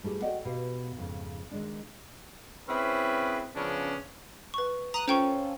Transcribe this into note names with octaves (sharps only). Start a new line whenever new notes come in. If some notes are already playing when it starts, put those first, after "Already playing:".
G3 A3 E4 G4 G#4
F#4 A4 D5 D#5 F#5 G5
B2 G4 F5
F2 G#2 C#3
D#3 G#3 D4
C4 C#4 E4 G#4 B4
C#3 F3 B3 C#4 D4
B4 C#6
A#5 D#6 F#6
C#4 F4 A4 C5 G5 C#6